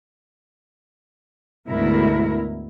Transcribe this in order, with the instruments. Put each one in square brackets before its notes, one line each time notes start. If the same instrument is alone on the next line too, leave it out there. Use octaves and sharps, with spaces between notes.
[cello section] D2 G#2 B2 E4 A#4